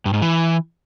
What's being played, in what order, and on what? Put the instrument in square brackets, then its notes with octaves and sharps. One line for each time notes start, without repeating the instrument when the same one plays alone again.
[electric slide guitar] G2
G#2
E3